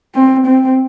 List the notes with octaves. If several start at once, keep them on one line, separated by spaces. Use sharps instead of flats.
C4
C4